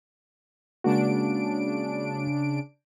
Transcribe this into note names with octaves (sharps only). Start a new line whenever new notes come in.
C#3 G#3 A#3 D4 F#4 D7